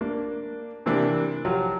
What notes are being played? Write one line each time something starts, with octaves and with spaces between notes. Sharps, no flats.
A#3 D4
C3 E3 A#3 D4
F3 F#3 F4 G4